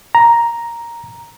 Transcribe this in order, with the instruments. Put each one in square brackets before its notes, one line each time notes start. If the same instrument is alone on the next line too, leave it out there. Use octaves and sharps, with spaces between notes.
[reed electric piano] A#5